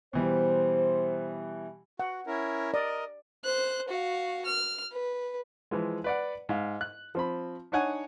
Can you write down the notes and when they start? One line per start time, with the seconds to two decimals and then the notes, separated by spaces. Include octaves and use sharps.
0.13 B2 E3 G3 C5
1.99 F#4 F#5
2.27 C#4 E4 A#4
2.74 A#4 D5 D#5
3.44 C5 F#6
3.88 F#4 F5
4.45 F6
4.92 B4
5.71 E3 F3 G#3
6.04 B4 D5 F#5
6.49 G#2 F5
6.81 F#6
7.15 F3 C4 B5
7.72 D4 D#4 C#5 F#5 G#5